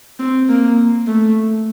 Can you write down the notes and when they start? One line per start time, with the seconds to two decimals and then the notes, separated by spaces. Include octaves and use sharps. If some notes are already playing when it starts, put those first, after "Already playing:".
0.19 C4
0.49 A#3
1.07 A3